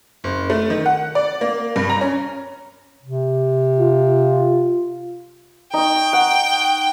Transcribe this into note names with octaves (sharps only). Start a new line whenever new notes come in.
F#1
A3
D#3
F#5
D5
A#3
G2
A#5
C#4
C3
F4
D#4 G5 C#6
F#5